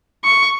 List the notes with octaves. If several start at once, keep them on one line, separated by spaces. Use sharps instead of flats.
C#6